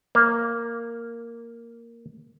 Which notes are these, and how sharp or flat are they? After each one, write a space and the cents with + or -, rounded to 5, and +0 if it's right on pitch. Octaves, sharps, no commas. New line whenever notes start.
A#3 -5